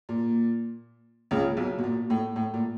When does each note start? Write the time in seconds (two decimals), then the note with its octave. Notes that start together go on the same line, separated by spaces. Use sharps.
0.09 A#2
1.31 C#2 C#3
1.57 B1 B2
1.79 B2
1.83 A#2
2.10 A2
2.36 A2
2.54 A#2